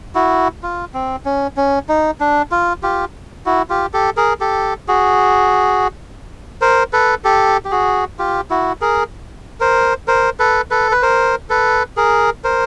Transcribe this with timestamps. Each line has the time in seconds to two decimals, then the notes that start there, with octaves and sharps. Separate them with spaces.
0.15 E4 F#4
0.63 F4
0.94 C4
1.25 C#4
1.57 C#4
1.89 D#4
2.20 D4
2.51 F4
2.83 F4 G4
3.46 E4 F#4
3.69 F4 G4
3.93 G4 A4
4.17 G#4 A#4
4.41 G4 A4
4.88 F#4 G#4
6.61 A#4 C5
6.93 A4 B4
7.24 G4 A4
7.65 G4
7.71 F#4 G#4
8.19 F4 G4
8.50 E4 F#4
8.81 G#4 A#4
9.60 A#4 C5
10.08 A#4 C5
10.39 A4 B4
10.71 A4 B4
10.92 B4
11.02 A#4 C5
11.50 A4 B4
11.97 G#4 A#4
12.44 A#4 C5